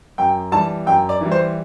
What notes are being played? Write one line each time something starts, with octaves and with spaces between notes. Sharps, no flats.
F#2 G5
E3 G3 A5
F#2 G5
D5
E3 G3
C5